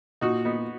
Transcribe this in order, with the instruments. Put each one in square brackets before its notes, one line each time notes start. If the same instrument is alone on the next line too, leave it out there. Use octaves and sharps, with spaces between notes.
[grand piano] A#2 [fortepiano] D#4 F#4
[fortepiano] B3 D#4